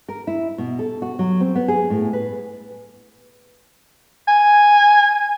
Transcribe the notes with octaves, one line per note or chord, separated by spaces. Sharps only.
A#4
E4
B2
A4
F#4
F#3
C4
B3
G#4
A2
B4
G#5